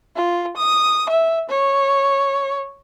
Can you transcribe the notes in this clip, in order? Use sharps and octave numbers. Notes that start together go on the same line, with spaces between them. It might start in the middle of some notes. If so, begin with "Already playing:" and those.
F4
D#6
E5
C#5